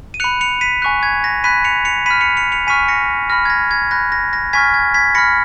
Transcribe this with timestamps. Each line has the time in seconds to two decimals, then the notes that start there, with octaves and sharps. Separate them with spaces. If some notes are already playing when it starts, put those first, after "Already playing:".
0.14 D#7
0.20 B5 F#6 C#7 F7
0.41 C#7 F7
0.61 B6 D#7
0.82 G#5 C#6 F#6
1.03 G#6
1.24 A#6
1.44 B5 F#6 B6 D#7
1.64 C#7 F7
1.85 C#7 F7
2.06 B5 F6 B6 D#7
2.21 C#7 F7
2.37 C#7 F7
2.52 C#7 F7
2.67 G#5 C#6 F6 B6 D#7
2.88 A#6 C#7
3.30 B5 F6 A#6
3.45 G#6
3.50 A#6
3.71 G#6
3.91 B5 F#6 A#6
4.12 A#6
4.33 A#6
4.53 G#5 C#6 F6 G#6 B6
4.74 G#6
4.94 G#6 B6
5.15 B5 F6 A#6 C#7